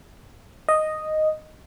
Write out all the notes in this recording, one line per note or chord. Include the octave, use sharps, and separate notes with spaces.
D#5